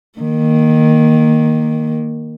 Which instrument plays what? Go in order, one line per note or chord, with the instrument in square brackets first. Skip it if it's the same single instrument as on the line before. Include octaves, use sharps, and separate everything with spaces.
[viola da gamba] D#3 A#3